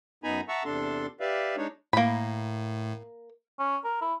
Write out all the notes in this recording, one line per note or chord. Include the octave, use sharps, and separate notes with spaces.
F#2 B3 D#4 G#5 A#5 B5
E5 F#5 A5 A#5 C#6 E6
E2 C3 D4 A4 C6
G4 B4 D5 E5 F5
G#3 D4 D#4 C#5
A2 A#3 B5
C#4
A#4
E4